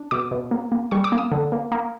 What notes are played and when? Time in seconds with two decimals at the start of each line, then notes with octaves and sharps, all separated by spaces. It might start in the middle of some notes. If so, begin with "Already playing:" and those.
Already playing: D4
0.11 B2 D6
0.31 B2
0.51 A#3
0.72 A#3
0.91 G3 C#6
1.04 D6
1.12 A#3
1.18 D#6
1.32 D3
1.52 A#3
1.72 A#3